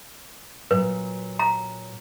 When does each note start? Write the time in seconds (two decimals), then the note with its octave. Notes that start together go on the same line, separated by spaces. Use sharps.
0.71 A#2 F#3 B4
1.39 A#5